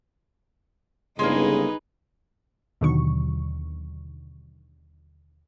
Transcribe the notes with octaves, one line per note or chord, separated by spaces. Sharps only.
G1 C#3 G#3 A#3 D#4 G#4 B4
D#2 B2 D3 D#3 F#3 C#6